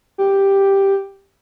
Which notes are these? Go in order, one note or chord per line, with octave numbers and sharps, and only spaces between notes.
G4